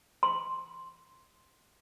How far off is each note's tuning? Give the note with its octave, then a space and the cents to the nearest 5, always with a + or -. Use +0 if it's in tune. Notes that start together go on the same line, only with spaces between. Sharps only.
C6 +0